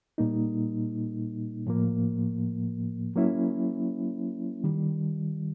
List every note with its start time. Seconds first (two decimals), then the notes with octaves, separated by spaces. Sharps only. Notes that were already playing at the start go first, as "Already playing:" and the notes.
0.18 A#2 G3 A#3 D#4
1.67 A2 F3 A#3
3.16 F#3 A#3 C#4 E4
4.64 D#3 G3